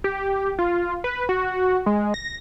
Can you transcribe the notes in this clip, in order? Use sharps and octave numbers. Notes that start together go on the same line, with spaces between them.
G4
F4
B4
F#4
G#3
A#6